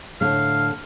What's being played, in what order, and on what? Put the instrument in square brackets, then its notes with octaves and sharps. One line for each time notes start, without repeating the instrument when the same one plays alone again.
[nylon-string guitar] A2 D3 A3 [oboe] F5